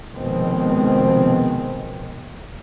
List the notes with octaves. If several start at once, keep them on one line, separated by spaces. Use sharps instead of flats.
F1 B2 D#3 G#3 C4